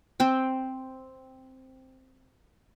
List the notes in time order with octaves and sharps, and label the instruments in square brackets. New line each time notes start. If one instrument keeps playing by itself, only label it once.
[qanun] C4 G5